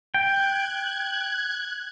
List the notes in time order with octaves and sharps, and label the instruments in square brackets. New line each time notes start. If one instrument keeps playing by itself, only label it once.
[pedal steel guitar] G5 [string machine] F#6 G#6